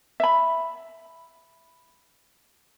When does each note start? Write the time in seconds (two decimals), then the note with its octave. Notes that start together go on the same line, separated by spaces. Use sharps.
0.20 E5 B5